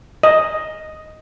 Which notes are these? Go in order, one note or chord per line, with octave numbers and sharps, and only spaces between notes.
D#5